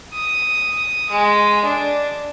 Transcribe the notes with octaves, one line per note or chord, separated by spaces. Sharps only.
D#6
G#3
D4